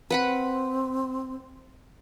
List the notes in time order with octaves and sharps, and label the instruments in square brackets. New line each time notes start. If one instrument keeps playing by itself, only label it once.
[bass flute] C4 [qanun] B4 F#5 B5